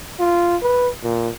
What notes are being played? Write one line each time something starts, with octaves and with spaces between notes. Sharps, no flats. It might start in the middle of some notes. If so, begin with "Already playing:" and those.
F4
B4
A#2